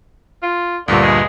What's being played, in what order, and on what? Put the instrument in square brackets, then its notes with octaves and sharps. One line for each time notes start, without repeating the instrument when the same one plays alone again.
[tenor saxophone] F4
[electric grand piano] D2 G2 A#2 [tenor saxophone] D3
[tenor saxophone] G#3